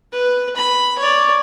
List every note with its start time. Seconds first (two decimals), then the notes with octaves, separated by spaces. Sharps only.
0.12 B4
0.56 B5
0.99 C#5 D5